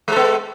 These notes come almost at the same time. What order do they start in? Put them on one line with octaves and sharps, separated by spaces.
G#3 A4 B3